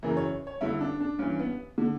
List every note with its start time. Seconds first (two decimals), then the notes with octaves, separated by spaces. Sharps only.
0.03 F#2 C#3 E3 A#4
0.17 C#5
0.47 C#5
0.61 G2 D3 E4
0.81 D4
1.00 D4
1.19 G2 E3 C#4
1.39 B3
1.78 D3